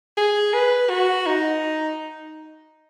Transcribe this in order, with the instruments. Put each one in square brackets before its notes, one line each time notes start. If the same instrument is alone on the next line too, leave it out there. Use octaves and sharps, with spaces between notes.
[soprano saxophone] G#4
B4
F#4
D#4